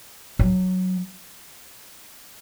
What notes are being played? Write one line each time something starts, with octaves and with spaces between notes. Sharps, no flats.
F#3